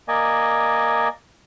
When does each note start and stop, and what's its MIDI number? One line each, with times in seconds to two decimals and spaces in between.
0.08 1.08 58
0.08 1.08 74
0.08 1.08 75
0.08 1.08 80